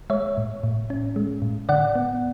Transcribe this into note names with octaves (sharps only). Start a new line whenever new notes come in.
G#3 C#5 E5
A2
A2
C#4
G#3
A2
D3 D5 F#5
B3